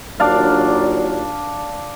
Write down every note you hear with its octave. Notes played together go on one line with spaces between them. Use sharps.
D#2 A#2 F#3 D4 D5 F5